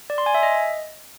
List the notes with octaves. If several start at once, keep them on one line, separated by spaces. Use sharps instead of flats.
D5
C6
G#5
E5
D#5